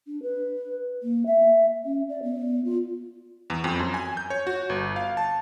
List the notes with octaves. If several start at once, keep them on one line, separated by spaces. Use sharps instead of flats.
D4
B4
A#3
E5
C#4
D5
B3
F4
E2
F2
F#2
G#5
G6
C#5
F#4
G1
F5
A5